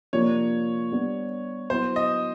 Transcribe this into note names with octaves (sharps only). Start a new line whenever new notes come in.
C3 F3 A#3 D4 C#5
G3 B3 D4
F#3 B3 E4 C5
D#5